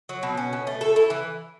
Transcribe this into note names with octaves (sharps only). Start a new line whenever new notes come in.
F#3
B2
C#4
B2
A3
A4
E4
E3